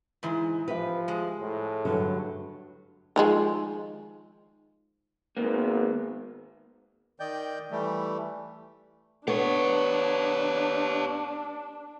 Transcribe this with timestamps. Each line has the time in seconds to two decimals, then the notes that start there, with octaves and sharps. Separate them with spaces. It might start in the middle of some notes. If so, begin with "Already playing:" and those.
0.23 G#2 E3
0.68 F3 G4 B4 E5
1.08 G#3
1.40 A2
1.85 G2 D3 F#3
3.16 D#3 F3 G#3
5.37 G#1 A#3 B3
7.20 D#3 D5 D#5 G5 G6
7.71 E3 G3 A3
9.28 B3 D4 G4 C#5